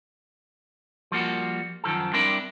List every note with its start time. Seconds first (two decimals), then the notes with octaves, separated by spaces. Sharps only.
1.12 F3 G3 A#3 F#4
1.84 F#2 D#3 F3 A4
2.13 G3 C4 D4 E4 A#4 D5